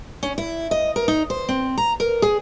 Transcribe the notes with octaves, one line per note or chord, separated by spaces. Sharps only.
C#4
E4
D#5
A#4
D#4
C5
C4
A#5
A#4
G#4